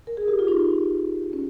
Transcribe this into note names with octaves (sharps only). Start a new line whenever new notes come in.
A#4
G#4
G4
F4
D#4
C#4